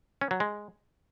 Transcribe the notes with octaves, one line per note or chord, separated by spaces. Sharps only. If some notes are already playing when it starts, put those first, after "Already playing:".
C#4
F#3
G#3